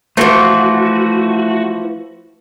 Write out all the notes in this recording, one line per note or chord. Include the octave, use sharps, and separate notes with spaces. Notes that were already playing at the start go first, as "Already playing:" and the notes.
E3 F3 A3 F#4